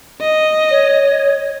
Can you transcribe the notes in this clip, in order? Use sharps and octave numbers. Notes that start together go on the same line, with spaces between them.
D#5
C#5